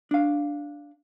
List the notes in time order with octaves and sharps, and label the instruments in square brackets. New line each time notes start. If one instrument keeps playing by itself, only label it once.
[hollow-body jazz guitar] D4 F5